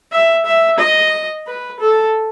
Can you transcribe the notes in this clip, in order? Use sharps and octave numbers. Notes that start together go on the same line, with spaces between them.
E5
E5
D#5
B4
A4